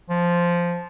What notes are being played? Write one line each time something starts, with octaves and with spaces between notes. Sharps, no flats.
F3